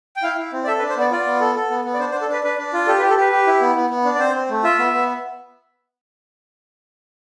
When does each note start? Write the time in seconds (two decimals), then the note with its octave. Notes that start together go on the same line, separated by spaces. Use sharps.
0.16 G5
0.23 E4 F5
0.38 E4
0.53 C4
0.64 D5
0.67 A4 E5
0.78 B4
0.82 D4
0.89 C5
0.97 B3 D5
1.11 F4 D5
1.27 B3
1.40 A4
1.55 A4
1.70 B3
1.85 B3
1.94 D5
1.99 D4 C5
2.11 C5
2.14 D4
2.21 A4
2.28 D4 B4
2.43 D4 B4
2.58 D4
2.73 F4
2.87 G4 A4
2.98 B4
3.02 G4
3.10 A4
3.17 G4 B4
3.32 G4
3.47 E4
3.61 B3
3.76 B3
3.90 B3
4.04 D4
4.15 D5
4.19 C4 C5
4.35 C4
4.50 A3
4.63 F4 E5
4.79 B3
4.93 B3